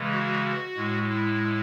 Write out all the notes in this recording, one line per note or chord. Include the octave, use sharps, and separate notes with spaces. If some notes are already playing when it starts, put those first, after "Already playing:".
Already playing: C#3 E3 G#3
F#4
A2 G#3
E4